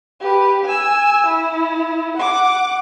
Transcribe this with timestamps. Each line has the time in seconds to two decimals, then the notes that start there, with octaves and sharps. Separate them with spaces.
0.20 G4 B4
0.64 G#5 E6
1.27 E4
2.18 F#5 D6